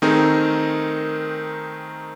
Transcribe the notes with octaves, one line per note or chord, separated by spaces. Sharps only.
D#3 A3 C4 D#4 G#4 A#4